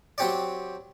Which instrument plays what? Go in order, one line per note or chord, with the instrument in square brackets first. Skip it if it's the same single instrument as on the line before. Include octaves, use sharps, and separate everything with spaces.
[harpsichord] F#3 C4 G4 C#5 D5